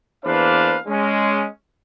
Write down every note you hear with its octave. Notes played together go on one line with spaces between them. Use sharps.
E2 A#3 D4 B4 C5 F5
G#3 C#4